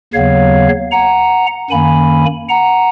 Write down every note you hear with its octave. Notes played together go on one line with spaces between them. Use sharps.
D#2 C#3 F#3 B3 C#5 F5
F#5 A#5
F#2 D#3 A#3 C#4 G#5 B5
F#5 A#5